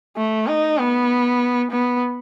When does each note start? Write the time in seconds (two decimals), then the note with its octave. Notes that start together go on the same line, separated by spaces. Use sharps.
0.17 A3
0.47 D#4
0.78 B3
1.71 B3